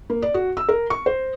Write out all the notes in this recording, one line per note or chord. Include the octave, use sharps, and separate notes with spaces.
A#3
D5
F#4
E6
A#4
C#6
C5